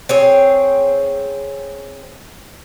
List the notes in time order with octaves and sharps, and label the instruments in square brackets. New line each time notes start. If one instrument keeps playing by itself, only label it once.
[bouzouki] C4 G#4 C#5